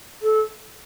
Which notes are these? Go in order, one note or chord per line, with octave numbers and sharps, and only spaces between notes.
A4